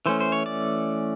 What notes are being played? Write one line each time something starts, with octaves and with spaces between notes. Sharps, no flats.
E3 A3 C#4 C5
C5
C#5
D5